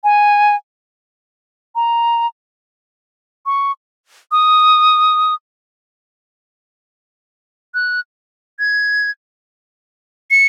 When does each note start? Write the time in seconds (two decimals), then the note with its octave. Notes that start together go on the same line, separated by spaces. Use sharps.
0.04 G#5
1.75 A#5
3.46 C#6
4.32 D#6
7.74 F#6
8.59 G#6
10.31 C#7